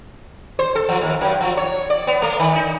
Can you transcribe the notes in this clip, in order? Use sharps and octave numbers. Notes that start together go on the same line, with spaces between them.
C5
A4
F3
D#2
F#2
F3
C#5
D5
B3
A3
D#3
D#4